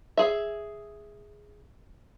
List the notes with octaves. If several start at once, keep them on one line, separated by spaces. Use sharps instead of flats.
G#4 E5